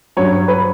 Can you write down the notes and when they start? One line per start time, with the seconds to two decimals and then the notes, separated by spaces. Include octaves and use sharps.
0.17 G2 F#3 C#5
0.32 C#5
0.48 B4